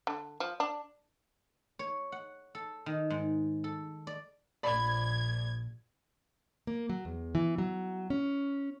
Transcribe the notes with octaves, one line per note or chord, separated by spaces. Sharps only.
D3
F3
D4
C#5
F#5
A4
D#3
G#2
A4
D5
A#1 D5 B5 G#6
A#3
F#3
E2
E3
F#3
C#4